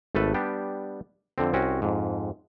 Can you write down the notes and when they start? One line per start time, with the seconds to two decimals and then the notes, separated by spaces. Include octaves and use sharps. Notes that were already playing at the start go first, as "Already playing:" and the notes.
0.15 G#1 A3 A4 B4
0.34 G3 B3 D4 G4
1.38 F2 D3 C4
1.53 C2 C4 C#4 F#4
1.82 F2 G#2